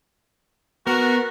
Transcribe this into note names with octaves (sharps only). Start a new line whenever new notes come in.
B3 F#4 A#4